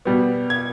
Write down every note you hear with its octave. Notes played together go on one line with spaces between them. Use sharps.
B2 G3 B3
G#6